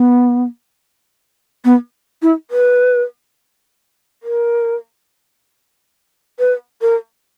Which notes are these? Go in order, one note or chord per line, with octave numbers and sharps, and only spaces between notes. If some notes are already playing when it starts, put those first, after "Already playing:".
Already playing: B3
B3
E4
B4
A#4
B4
A#4